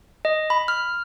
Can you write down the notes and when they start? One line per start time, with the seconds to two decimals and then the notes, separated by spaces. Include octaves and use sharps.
0.25 D#5
0.50 B5
0.68 F6